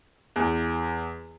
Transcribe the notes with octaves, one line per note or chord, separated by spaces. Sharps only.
E2